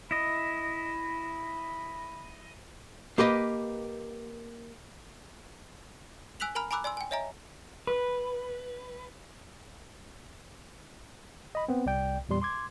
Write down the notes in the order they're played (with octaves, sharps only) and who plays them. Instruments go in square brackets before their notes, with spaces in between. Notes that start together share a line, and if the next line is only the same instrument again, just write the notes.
[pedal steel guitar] E4 D#5 [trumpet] B5
[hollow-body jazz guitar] A#3 G4 B4 D#5
[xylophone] G#5 E6 F#6 B6 F7 F#7
A#4 G#5 A#5 B5 F6
G#5 A#5 B5 D6 E6 F#6
D5 G#5 C6 E6
G5 G#5
C#5 D#5 E5 G#5 A#5
[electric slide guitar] B4
[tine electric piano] D#5 B5
B3 C4
C2 D5 G5
E2 A#2 G3 C6
C6 D6 G#6